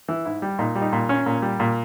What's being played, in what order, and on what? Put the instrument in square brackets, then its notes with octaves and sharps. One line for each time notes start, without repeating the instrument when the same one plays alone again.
[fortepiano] E3
G#2 E4
G3
A#2 D#4
G3
D#4
A#2
C#4
A#2
G3
A#2